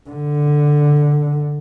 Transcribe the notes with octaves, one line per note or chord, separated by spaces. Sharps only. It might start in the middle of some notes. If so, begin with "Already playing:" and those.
D3